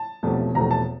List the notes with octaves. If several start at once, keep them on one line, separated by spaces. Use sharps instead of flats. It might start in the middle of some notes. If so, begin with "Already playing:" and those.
Already playing: A5
E1 E2 C3 F3 A3
E1 E2 C3 F3 A3 A#5
A5